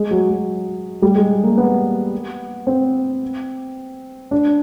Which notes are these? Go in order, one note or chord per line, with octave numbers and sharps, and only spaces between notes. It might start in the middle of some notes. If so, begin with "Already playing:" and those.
Already playing: G#3
F#3
F#3
G3
G#3
A#3
B3
C4
D4